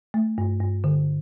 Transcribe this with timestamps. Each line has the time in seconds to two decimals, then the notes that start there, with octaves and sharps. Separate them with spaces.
0.14 A3
0.38 G2
0.60 G2
0.84 D3